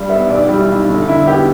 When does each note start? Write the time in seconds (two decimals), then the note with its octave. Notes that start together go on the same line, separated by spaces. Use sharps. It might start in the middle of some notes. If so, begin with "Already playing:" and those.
Already playing: G2 G3
0.09 B3 E5
0.29 B1 D5
0.44 G3 G4
0.58 E4
0.69 B1 E4
0.88 G1 E4
1.08 D3 E4
1.27 B3 G4